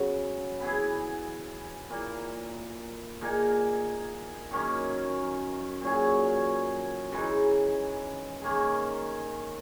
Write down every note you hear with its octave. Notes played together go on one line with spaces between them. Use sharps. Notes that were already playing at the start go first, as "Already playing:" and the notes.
Already playing: C#3 F#3 B3
E3 B3 E4 G#4
A#2 A#3 E4
A#2 A#3 D#4 G#4
F#2 D#3 A#3 C#4
A#2 F#3 C#4 G#4
C#3 E3 G#3 D#4
D#3 A#3 C#4 G#4